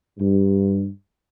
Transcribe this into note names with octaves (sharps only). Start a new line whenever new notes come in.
G2